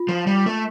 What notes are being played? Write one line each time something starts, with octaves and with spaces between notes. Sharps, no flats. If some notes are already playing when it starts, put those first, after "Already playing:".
Already playing: F4
F3
G3
A3